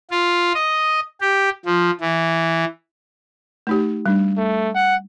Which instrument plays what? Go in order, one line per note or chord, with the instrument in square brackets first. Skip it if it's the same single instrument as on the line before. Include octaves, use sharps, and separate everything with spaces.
[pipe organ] F4
D#5
G4
F3
E3
[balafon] A3 D#4 G4
G3 D4
[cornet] A3
F#5